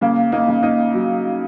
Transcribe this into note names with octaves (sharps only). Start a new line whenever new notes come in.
C#3 A#3
A#3 D#4
C#3
A#3 D#4
F#3